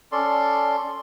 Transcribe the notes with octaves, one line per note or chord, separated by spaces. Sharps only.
C#4 A4 D5 C6